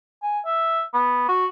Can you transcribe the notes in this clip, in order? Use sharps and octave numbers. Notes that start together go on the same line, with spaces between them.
G#5
E5
B3
F#4